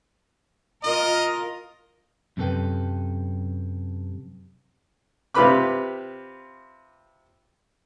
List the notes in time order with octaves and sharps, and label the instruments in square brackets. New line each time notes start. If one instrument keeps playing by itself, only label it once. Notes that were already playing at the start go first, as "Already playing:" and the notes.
[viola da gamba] F4 A#4 [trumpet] D#5
[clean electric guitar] F#2 C3 A4 B4 G5
[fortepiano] C3 F4 G4 B4 B5 D6